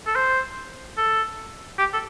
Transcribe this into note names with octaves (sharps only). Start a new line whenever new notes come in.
A4
C5
A4
G4
A4